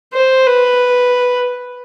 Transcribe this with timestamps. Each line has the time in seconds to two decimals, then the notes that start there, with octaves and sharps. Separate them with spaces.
0.13 C5
0.47 B4